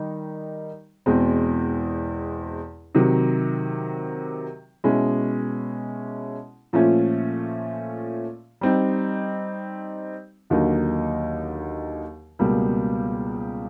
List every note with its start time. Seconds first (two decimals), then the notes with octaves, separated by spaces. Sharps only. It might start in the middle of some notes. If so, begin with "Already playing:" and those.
Already playing: D#3 G3 D#4
1.06 E2 B2 G#3 C4
2.95 C3 D#3 F#3
4.84 B2 G#3 C#4 E4
6.73 A#2 F3 A3 C#4
8.61 G3 C4 D#4
10.50 D#2 D3 F#3 A#3 D#4
12.39 C#2 B2 G3 A#3